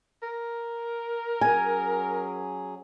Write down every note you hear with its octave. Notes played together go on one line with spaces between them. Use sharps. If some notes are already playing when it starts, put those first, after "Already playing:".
A#4
F#3 C#4 G#4 G#5